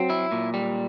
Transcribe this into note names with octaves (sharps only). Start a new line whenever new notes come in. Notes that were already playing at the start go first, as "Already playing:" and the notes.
Already playing: F#3 C4
E4
A#2
G3